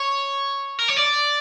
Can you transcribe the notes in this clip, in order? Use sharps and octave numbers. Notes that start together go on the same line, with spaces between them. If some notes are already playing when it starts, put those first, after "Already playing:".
Already playing: C#5
A#4
C#5
D5